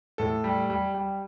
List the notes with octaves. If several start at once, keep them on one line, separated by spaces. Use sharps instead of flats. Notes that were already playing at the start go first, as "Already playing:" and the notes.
A2 A4
G3
G3
G3